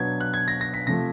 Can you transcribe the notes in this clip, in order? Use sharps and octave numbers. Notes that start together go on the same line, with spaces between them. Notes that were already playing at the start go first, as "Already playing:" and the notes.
Already playing: B2 F#3 B3 D4 G#6
F#6
G#6
A#6
A#6
B6
C3 F3 A3 A#6